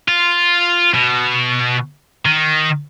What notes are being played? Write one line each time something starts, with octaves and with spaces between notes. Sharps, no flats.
F4
B2
D#3